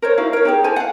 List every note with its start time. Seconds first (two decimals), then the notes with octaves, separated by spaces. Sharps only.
0.02 A#4 C5 C#5
0.17 D#4 E4 F#4 F5
0.33 A#4 C#5
0.45 D#4 G4 G#4
0.64 E4 A4 C5 G#5
0.76 F5 F#5